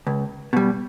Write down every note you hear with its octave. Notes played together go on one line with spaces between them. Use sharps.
C#2
B2 G3